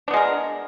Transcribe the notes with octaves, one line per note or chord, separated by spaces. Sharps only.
G#3 B3 D4 A#4